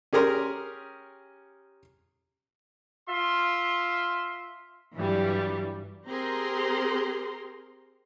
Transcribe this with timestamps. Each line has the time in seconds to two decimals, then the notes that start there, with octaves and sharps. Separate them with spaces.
0.13 C#4 G4 G#4 A#4 A#5 C6
3.08 F4 E5 C6
4.95 G2 E3 F#3 G3
6.08 C4 G4 G#4 A#4 A#5 C6